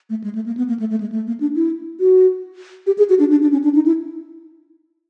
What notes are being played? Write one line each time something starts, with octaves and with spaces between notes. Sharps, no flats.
A3
G#3
A3
A#3
B3
A#3
A3
A3
G#3
A3
A#3
D4
E4
F#4
G4
G#4
F#4
D4
D4
D4
C#4
D4
D#4
E4